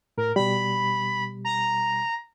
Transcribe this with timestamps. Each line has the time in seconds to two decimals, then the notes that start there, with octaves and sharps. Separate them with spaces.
0.18 A2 A#4
0.36 B2 G3 B5
1.45 A#5